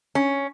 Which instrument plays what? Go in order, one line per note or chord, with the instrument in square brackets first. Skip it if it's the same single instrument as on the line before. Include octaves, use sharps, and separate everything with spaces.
[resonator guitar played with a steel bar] C#4